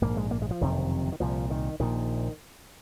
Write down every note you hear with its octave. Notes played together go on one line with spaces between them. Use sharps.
A#1 G#2 A#3
G#3
A#3
G#3
F3
F#1 F2 C3 D#3
D#3
C2 A#2 F3
D#3
A#1 A#2 D#3